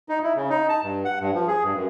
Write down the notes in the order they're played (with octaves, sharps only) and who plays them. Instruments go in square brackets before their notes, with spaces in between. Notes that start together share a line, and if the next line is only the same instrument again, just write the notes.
[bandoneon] D#4
E4
C#3
D#4
A5
G2
F#5
G2
F3
G#4
G2
F#2